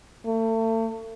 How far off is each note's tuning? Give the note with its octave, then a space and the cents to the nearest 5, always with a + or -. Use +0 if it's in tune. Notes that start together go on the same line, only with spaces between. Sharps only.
A3 +35